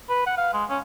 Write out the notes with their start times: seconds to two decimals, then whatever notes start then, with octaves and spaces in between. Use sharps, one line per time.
0.09 B4
0.26 F#5
0.37 F5
0.53 G#3
0.70 C#4